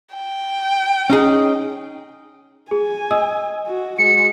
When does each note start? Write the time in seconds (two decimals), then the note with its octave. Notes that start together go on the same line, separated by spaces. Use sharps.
0.13 G5
1.10 C#4 D#4 G#4
2.71 G#4 G#5
3.11 D#5 D#6 E6
3.67 F#4
3.98 G#3 F#4 C#7